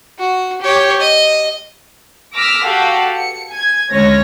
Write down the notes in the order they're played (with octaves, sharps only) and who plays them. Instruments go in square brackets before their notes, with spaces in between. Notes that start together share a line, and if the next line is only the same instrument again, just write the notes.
[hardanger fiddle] F#4
G4 C#5
D#5
[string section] D6 E6 F6 A#6 B6
F#4 G4 A4 F5 F#5
C#7
G#5 G#6
D2 G#3 C#4 C#5 A#6